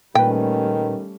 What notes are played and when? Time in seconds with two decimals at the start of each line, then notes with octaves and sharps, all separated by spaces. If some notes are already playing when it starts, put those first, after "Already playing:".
0.15 A#2 D#3 G3 A3 C#4 B4 G5